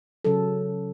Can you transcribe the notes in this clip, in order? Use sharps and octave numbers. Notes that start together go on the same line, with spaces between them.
C#3 F#3 A4